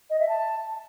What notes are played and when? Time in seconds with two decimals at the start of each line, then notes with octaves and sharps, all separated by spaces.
0.10 D#5
0.19 E5
0.29 A5
0.67 A5